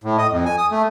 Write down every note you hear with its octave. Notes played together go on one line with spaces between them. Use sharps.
A2
D#5
F2
G#5
D#6
A3